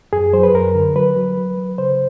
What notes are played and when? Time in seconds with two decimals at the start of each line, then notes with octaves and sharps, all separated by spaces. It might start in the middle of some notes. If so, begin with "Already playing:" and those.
0.13 F#2 G#4
0.33 F#3 C5
0.43 B4
0.54 F#2 A#4
0.75 D3
0.96 F#3 B4
1.16 F#3
1.37 F#3
1.57 F#3
1.78 C#3 C5